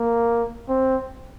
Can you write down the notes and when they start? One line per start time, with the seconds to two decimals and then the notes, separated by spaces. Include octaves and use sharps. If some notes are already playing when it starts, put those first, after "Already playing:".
Already playing: A#3
0.69 C4